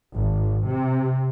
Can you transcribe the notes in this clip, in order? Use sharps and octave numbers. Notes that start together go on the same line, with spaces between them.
G#1
C3